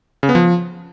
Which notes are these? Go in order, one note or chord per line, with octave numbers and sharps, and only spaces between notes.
C#3
B3
F3